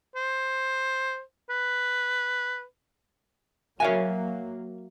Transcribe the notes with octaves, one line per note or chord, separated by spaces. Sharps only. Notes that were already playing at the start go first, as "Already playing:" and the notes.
C5
B4
F#3 A#3 F#4 A#4 C#5 E5 F5 G#5